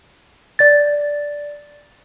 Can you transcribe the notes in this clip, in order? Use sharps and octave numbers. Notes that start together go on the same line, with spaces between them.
D5 A6